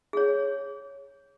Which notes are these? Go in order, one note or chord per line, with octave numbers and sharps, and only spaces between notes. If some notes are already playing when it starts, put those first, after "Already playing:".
G#4 C#5